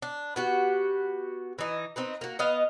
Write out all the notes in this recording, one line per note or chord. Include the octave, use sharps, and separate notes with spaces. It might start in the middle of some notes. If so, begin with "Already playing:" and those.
D4
B3 F#4 G4
E3 D#4
C4 D#4 B4
A#3 F#4
B3 D#5 F5